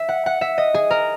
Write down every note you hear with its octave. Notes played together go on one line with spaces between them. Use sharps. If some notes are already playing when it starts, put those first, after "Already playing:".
Already playing: E5
F#5
F#5
E5
D#5
G#4
A#4